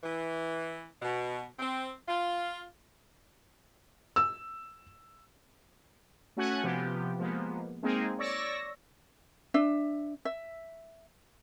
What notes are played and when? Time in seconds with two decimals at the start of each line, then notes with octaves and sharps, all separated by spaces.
0.04 E3
1.02 B2
1.59 C4
2.08 F4
4.16 E6
6.37 A3 C#4 F#4 F#5 G#5
6.63 C3 F3 B3 G4
7.18 F3 G#3 A#3 B3
7.83 G#3 A#3 C4 D#4 G#4
8.18 C#5 D5 C#6 E6 A#6
9.54 D4 E5
10.25 E5